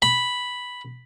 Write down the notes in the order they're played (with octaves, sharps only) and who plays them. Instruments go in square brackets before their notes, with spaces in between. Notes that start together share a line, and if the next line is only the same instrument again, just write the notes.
[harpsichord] B5